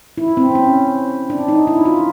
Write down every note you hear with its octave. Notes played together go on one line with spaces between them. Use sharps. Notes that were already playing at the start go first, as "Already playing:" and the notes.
E4
C4
C#4
D4
D#4
E4
F4